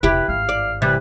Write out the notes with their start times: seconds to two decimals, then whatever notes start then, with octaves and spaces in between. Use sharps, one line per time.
0.03 E1 C3 E4 G4 B4
0.28 G#1 G2 F5
0.49 D5
0.82 C3 E3 G3 B4